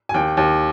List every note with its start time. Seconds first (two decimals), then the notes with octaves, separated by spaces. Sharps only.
0.09 G#5
0.14 D#2 G5
0.37 D#2